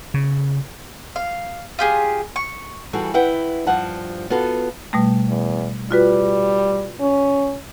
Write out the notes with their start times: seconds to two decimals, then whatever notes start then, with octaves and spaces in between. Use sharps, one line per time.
0.14 C#3
1.16 F5
1.79 F4 G4 G#4
2.36 C#6
2.93 E3 G3 F#4 G#4 A4
3.14 E4 B4 F#5 G5
3.67 G2 F3 F#5 A5
4.30 B3 F4 F#4 A4
4.93 B2 G3 A3
5.28 E2
5.91 G3 F4 F#4 B4
7.00 C#4